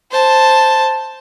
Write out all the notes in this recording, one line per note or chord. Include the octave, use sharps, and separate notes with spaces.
C5 A5